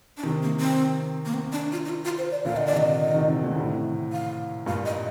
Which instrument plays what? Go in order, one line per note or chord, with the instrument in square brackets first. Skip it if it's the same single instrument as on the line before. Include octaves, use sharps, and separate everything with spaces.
[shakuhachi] D4
[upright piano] C3 D#3 [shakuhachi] C4
[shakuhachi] A#3
C4
A#3
C4
D4
F4
D#4
F4
F4
C5
D5
[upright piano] A#2 D3 [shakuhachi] F5
[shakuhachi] D#5
D5
[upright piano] C3 D#3 [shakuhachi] D#5
[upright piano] C3 D#3
C3 D#3
A#2 D3
A2 C3
[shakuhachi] F5
[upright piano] G2 A#2 [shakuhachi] F5
[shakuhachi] D#5